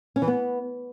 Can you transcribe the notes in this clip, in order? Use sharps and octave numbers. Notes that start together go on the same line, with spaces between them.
C#4
E3
B3